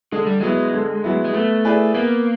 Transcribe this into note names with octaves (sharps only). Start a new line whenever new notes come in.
D3 G#3
G3
F#3 G#3 B3 E4
D3
F#3 B3 E4
G#3
A3 B3
E4 G#4 B4 D5
A#3 B3